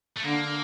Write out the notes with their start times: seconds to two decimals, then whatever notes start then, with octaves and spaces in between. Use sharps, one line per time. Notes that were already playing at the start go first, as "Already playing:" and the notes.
0.16 A3
0.23 D3 A#3